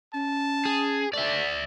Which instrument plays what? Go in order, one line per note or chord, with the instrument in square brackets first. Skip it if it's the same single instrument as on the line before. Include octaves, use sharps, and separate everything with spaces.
[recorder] C#4 [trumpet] A5
[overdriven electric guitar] G#4
[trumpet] A3 [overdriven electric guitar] D5 E5